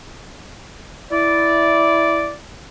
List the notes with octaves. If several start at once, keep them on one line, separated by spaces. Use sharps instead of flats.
E4 D5